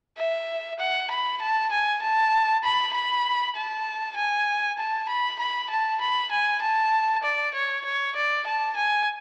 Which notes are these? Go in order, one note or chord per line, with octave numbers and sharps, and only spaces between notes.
E5
F#5
B5
A5
G#5
A5
B5
B5
A5
G#5
A5
B5
B5
A5
B5
G#5
A5
D5
C#5
C#5
D5
A5
G#5